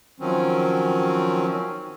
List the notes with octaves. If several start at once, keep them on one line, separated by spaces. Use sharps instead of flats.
D#3 F3 F#3 C4 C#4